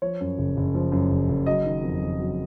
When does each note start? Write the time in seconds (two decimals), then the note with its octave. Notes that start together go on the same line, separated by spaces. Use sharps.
0.02 F3 C#5
0.20 F#2
0.38 F#1
0.57 F#1
0.75 F3
0.92 F#2
1.11 F#1
1.29 F#1
1.46 F#3 D#5
1.65 D#3
1.84 F2
2.01 F2
2.20 F#3